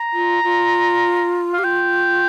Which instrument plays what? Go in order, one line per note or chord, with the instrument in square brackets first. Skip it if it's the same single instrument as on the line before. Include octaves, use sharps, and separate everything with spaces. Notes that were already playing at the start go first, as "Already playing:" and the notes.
Already playing: [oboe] A#5
[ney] F4
F4
[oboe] F5
[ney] G4
[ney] F4 [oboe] G5